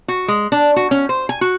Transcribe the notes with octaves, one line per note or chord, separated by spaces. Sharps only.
F#4
G#3
D4
F#4
C#4
C5
G#5
F#4